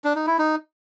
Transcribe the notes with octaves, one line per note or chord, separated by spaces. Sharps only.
D4
D#4
E4
D#4